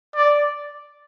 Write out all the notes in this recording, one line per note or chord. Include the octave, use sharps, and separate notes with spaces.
D5